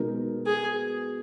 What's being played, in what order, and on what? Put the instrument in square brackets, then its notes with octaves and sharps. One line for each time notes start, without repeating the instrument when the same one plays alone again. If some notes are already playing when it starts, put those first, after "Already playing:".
Already playing: [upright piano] B2 G#3 D#4 A#4
[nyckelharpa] G#4